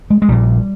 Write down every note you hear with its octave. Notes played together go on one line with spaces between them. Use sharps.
G#3
G#3
A#1 A#2 G3